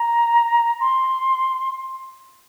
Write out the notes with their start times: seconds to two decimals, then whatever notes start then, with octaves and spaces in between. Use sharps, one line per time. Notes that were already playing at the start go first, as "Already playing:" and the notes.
Already playing: A#5
0.80 C6